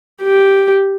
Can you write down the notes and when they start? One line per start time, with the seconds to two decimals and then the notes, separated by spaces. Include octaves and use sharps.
0.22 G4